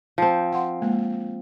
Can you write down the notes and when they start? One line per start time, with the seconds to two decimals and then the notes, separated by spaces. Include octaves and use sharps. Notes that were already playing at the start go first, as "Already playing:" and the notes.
0.18 F3 C4
0.52 F5 F#5 C6
0.82 G#3 A#3